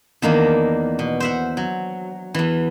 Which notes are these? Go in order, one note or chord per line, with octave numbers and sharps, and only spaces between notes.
E2 D#3 A#3 D4
B2
C5 E5 F#5
F#3
E2 E3